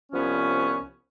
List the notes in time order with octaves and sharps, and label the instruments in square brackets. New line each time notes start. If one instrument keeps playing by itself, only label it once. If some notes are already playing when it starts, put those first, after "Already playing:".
[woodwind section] C2 F3 B3 C#4